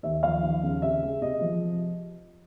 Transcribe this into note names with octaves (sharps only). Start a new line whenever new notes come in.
D#2 E5
F3 F5
D#2
C#3
C3 E5
G#3
C3 D#5
F3